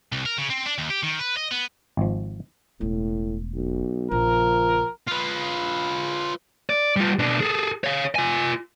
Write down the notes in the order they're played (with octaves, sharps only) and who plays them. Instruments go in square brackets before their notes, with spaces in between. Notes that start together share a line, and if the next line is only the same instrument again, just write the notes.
[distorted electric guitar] C2
A#4
C#3
C4
D4
D#2
G4
D#3
B4
D#5
B3
[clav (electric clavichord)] G#1 F3
[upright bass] E1 A3 [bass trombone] A2
[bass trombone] B1
[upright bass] A#1 C#3 [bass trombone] F3 [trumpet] A#4
[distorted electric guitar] F4 B4
[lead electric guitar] D5
G3 F4
B2 D4
G#4 A4
C#5 F5
F4 G#5